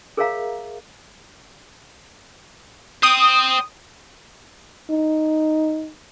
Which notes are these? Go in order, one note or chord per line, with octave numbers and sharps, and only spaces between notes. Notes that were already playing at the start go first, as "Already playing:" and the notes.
G#4 A#4 C#5 E5 F5 A#5
C5 G5 D#6
D#4